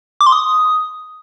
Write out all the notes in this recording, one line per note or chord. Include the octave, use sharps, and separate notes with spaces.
D6
C6
D#6